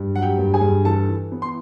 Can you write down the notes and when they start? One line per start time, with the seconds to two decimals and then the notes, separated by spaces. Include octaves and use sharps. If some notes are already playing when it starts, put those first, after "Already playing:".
Already playing: G2
0.14 F#3 F#5
0.22 G4 G5
0.39 G2
0.54 G#4 G#5
0.61 G2
0.85 E3 A4 A5
1.09 E3
1.32 B3
1.42 C6